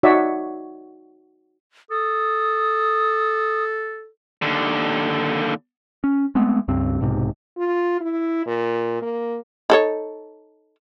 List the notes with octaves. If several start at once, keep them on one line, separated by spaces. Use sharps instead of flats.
D#4 F#4 C#5 D5 E5
A4 D#6
D#2 D3
C#4
G#3 A3 B3 C4
C#2 G2 C4
B1 G#2 C3
F4
E4
A#2
A#3
D#4 A4 C#5